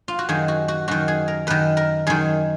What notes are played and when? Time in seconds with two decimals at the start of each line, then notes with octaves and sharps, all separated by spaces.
0.08 F4
0.19 F#4
0.29 F#2 D#3 G#4
0.48 F#4
0.68 F#4
0.88 F#2 D#3 F#4
1.08 G#4
1.28 A#4
1.47 F#2 D#3 B4
1.77 A#4
2.07 F#2 D#3 G#4